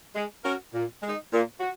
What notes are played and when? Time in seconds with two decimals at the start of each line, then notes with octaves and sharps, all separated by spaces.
0.14 G#3
0.43 C#4 F#4 A#4
0.73 A#2
1.02 G#3 D#4
1.32 A#2
1.60 F#4